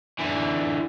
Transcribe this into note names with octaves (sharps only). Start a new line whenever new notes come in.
D3 E3